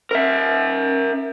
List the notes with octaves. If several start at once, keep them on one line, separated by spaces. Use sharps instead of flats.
A#4 E5